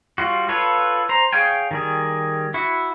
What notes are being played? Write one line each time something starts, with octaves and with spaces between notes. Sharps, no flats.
G3 F4 F#4
F4 A4 B4 C#5
C5 A#5
G#4 C#5 F5 G5 G#5
D#3 G3 G#4
E4 F#4